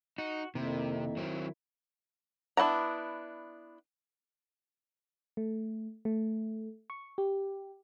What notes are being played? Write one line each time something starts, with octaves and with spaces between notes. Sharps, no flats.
D#4 F#4
F2 C3 D#3 A#3 E4
F#3 C4
B3 D4 E4 F#5 A#5
A3
A3
C#6
G4